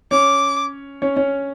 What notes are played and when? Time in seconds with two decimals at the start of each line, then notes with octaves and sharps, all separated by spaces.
0.11 C#4 C#5 D6
1.02 C#4 C#5
1.17 C#4 C#5